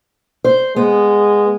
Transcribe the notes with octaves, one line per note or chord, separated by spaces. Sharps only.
C5
G#3 B3